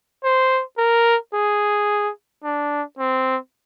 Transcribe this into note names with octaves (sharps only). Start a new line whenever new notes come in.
C5
A#4
G#4
D4
C4